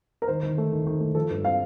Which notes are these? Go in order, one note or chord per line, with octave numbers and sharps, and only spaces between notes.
A#4
D#3 C5
D#3
A3
D#3
D#3
A3
F3 A4
G2
C4 F5